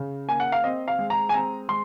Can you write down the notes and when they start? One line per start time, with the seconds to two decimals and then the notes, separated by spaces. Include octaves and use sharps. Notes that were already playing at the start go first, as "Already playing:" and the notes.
Already playing: C#3
0.28 A#3 G#5
0.40 F#5
0.52 F5
0.64 C4 D#5
0.88 F5
0.99 G#3
1.10 A#5
1.29 G#5
1.33 C4 A#5
1.68 G#3 C6